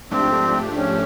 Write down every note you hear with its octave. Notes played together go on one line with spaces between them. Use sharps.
G#2 F3 A3 C4 D4 G4
C#4